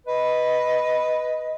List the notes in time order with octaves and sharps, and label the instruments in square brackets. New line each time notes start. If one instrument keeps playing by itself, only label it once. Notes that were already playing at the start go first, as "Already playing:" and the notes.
[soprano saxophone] B4 [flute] D#5